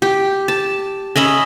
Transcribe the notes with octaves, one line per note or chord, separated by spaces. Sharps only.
G4
A5
C#4 D#5 E5 B5